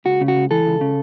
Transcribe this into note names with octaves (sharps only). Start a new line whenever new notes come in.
C#2 F#4
C#3
F#4
C#2
E3 A4
C#2
C#3